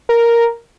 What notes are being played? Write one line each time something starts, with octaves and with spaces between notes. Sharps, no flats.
A#4